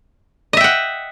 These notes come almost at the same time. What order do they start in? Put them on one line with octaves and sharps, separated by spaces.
D#5 E5 G5 F#5